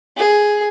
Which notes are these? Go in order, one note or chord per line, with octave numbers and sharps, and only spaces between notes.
G#4